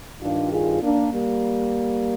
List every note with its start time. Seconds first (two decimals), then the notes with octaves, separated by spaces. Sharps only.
0.21 G2 D#3 D4 F4
0.52 F4 G#4
0.82 A#3 D4
1.12 G3 A#3